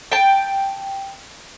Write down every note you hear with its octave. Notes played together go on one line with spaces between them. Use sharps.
G5 A5